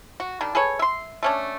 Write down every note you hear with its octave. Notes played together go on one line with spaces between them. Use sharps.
F#4
D#3 G3 D4
G#4 A4 B4 C#5
E5 C6
A3 C#4 D4